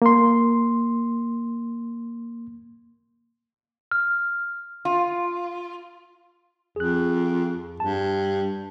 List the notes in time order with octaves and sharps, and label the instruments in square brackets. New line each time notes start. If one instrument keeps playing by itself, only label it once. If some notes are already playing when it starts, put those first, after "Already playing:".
[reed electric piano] A#3 C6
[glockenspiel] F6
[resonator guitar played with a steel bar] F4
[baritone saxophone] F2 [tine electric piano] G#4 F#6
[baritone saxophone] G2 [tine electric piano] A5